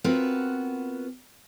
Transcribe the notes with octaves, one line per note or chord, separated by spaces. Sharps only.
B3 C4 F4 F#4 A#4 B4